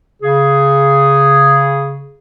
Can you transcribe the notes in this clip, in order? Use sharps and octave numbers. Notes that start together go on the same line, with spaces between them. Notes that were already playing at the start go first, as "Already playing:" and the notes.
C#3 G#4